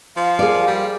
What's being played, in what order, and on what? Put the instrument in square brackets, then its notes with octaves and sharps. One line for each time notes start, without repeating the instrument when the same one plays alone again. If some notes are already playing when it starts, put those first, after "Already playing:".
[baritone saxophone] F3 [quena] F5
[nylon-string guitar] G#4 A#4 D5
[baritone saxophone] G3